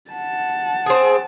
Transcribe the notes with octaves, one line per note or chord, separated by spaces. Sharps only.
F#5 A5
C4 G#4